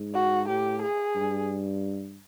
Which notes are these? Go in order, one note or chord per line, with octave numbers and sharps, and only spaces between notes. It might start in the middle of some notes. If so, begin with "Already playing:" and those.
Already playing: G#2
F#4
A2 G4
G#4
G2